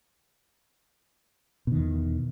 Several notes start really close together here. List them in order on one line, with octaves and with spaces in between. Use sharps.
B2 D#3 E2